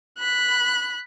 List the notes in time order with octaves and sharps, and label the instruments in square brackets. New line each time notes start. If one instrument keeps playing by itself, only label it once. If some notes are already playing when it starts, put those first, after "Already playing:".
[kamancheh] B5 F#6